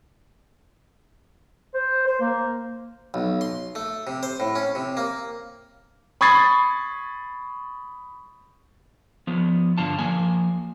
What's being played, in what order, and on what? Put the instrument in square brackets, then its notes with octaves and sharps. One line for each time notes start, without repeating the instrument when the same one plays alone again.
[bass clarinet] C5
C5
A#3
[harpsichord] B1
C6
A3
C3
C5
A2
C#4
C3
A#3
[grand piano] B5 C#6 D#6 G#6 A6 C7
[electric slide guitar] F3 B3
G2 D3 F4 A5
F3 A#3 G#5